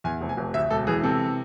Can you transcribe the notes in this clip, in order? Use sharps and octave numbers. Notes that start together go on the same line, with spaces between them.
E2 G#5
F1
G#5
F1
D2 E5
E1 A4
E3 G#4
C3 A4